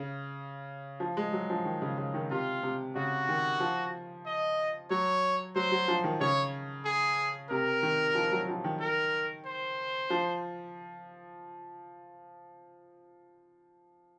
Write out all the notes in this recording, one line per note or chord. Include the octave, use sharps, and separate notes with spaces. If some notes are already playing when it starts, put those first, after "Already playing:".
Already playing: C#3
F3
G#3
F#3
F3
D#3
C#3
C#3
D#3
C3 F4
C3
C#3 F#4
D#3
F3
D#5
F#3 C#5
F#3 C5
F#3
F3
D#3
C#3 C#5
G#4
C3 A#4
D#3
F3
F#3
F3
D#3
A#4
C5
F3